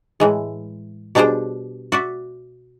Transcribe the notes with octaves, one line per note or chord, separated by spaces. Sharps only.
A2 E3 G#3
B2 G3 D4 G#4 C5 G5
F#4 D5 E5